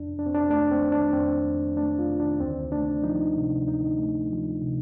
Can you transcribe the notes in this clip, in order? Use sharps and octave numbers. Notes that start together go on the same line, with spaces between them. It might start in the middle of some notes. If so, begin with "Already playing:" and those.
Already playing: F2 D4
F2 D4
C4
D4
A3 D4
C4
D#3
D4
F2 C4
F2
A3 D4
F4
D#3
D4
D2 C4
A3 D4
F3 D#4
C3
D2 D#4
A3
F3
C3